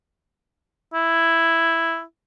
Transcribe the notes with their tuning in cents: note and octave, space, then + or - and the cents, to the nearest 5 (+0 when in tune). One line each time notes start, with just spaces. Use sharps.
E4 +5